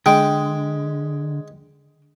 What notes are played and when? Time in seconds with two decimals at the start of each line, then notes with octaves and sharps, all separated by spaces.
0.06 D3 G#3 G5